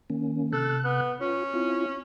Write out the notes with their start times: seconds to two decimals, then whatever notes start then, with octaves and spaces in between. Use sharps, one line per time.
0.10 D#3 A#3 C#4
0.53 C3 A4 F#6
0.84 B3
1.21 C#4 F4
1.54 C4 E4 F4